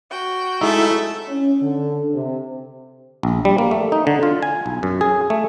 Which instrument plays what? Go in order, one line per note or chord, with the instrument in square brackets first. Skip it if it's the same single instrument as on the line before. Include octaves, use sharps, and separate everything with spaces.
[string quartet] F#4 G5
[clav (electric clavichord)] G#3 D#4 [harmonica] A3 [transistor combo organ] E4
[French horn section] C#4
D3
C3
[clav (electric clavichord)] A#1
G3
A#3
A3
D#4
D3
F4
G#5
B1
F#2
G#4
A3